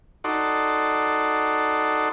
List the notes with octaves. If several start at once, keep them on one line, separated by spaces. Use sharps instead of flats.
D#4 F#4 A4 D5 C6